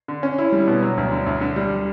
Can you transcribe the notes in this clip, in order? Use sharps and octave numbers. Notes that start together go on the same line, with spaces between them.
D3
C#4
E4
G3
B2
F#3
D2
D3
D2
D3
G3